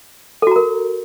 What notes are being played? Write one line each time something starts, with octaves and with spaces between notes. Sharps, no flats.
F#4 A4 A#4 A#5